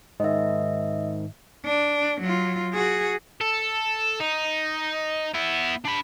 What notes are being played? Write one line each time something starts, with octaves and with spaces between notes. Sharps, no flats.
G#2 D#3 D#5 E5
D4
F#3 F4
F#4 G#4
A4
D#4
B3 E4
D4 B5